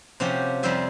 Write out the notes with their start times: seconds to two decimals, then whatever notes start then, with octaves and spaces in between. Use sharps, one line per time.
0.20 C3 F3 C#4 F#4 G4
0.63 F2 G3 C4 C5 E5 G#5